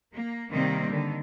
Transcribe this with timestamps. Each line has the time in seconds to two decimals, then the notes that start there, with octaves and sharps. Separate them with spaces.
0.14 A#3
0.51 C3 D#3 G3 A#3 C4
0.90 D3 D#3